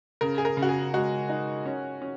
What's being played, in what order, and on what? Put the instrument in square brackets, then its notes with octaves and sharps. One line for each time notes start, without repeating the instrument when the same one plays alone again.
[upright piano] C#3 [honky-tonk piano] A#4
[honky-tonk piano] G#4
A#4
[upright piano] C#3
[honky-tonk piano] F#4
G#4
[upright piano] G#3 [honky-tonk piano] F#4
[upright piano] D#4
C#4
C#4